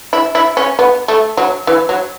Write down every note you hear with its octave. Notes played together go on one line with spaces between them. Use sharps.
E4
E4
C#4
B3
A3
F#3
E3
F#3